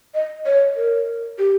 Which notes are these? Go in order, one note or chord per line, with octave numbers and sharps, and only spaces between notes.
D#5
C#5
A#4
G4